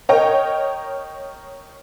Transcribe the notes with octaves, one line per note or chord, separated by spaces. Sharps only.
A#4 C#5 D#5 G5